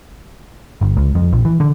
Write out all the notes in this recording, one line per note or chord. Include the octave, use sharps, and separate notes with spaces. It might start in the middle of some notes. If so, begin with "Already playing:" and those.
G1
C#2
F2
A#1
E3
D3